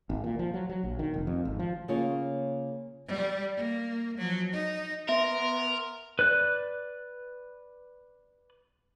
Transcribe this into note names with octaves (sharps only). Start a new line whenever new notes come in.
G#1
A#2
F3
F#3
F#3
A#1
D#3
F1
F2
G#1
F3
C#3 A#3 F4 C#5
G3
A#3
F3 F#3
D#4
B3 A#4 E5 C6
B4 D5 F#6